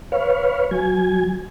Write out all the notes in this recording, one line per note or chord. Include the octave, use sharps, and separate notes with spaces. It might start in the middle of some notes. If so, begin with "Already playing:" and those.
B4 C#5 F5
F#3 G#5